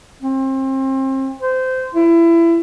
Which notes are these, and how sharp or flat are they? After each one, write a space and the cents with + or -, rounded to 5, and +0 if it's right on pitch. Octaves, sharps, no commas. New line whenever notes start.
C4 +35
C5 -20
E4 +25